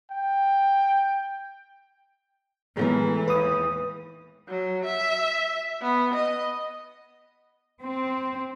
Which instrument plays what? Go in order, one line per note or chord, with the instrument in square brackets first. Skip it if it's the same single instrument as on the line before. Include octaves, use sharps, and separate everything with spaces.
[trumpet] G5
[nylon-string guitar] A2 B3 A#4 [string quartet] E3 [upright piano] G#3
[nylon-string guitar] D#2 [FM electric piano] B4 D#6
[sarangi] F#3
E5
B3
D#5
[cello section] C4